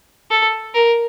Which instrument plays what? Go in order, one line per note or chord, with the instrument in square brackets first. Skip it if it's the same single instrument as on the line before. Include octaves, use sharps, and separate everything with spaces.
[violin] A4
A#4